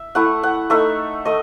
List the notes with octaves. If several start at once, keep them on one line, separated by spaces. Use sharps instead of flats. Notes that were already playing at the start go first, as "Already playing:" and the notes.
Already playing: E5
A3 E4 F#5
F#5
A3 D#4 E5
A3 D#5